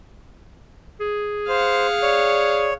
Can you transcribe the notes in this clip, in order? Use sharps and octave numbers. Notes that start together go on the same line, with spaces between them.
G#4
C5 F5 F#5
C#5 D5